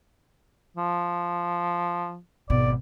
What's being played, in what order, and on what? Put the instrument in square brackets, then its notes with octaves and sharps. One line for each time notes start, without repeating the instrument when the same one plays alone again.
[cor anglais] F3
[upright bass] G#1 B2 [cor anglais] D5